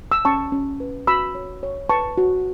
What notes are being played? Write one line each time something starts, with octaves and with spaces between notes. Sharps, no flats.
E6
C#4 A5 C#6
C#4
B4
F#4 B5 E6
C#5
C#5
B4 A5 C#6
F#4